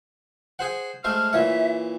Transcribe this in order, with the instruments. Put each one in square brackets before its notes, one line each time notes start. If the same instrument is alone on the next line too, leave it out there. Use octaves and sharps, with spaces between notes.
[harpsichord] G#4 C5 F#5
[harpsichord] G#3 A3 C5 [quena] F6
[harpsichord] A#2 E3 C#5 [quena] E5